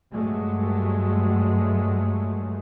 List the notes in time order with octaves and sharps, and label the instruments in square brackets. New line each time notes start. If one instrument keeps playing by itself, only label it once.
[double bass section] G2 F#3 G#3 A3